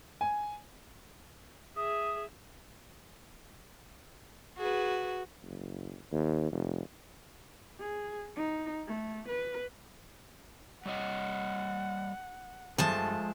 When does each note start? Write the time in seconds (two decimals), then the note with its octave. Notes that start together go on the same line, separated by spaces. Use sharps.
0.21 G#5
1.76 G#4 E5 D#6
4.58 F#4 G#4 B4
5.43 F#1
6.12 D#2
6.52 F1
7.79 G#4
8.36 D#4
8.87 A3
9.28 B4
10.86 G3 C#5 D#5 F#5
12.78 G2 F3 G#3 A3 A5